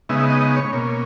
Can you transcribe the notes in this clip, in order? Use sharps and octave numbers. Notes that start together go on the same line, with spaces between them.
C#3 G#3 B3 D#4 E5
E5
D#5
D#5
C#5
B2 A#3 C#4